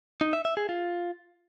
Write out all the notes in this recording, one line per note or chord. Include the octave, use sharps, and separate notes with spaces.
D#4
E5
E5
G#4
F4